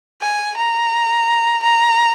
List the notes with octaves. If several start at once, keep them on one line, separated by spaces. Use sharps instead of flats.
G#5
A#5
A#5